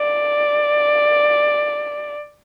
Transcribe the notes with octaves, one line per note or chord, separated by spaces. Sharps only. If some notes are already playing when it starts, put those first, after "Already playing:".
Already playing: D5